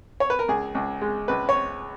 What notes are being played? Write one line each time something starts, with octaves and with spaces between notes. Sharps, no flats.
C#5
B4
A#4
C#2 G#4
C#2
G#3
C#2 B4
C#5